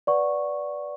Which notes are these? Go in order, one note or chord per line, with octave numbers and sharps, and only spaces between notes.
B4 D5 F#5 C#6